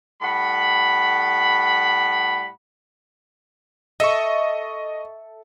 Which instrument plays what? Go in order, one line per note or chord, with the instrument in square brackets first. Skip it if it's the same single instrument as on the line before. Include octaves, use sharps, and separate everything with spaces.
[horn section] A2 G3 F#5 B5
[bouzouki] A4 E5 [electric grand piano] D#5 C#6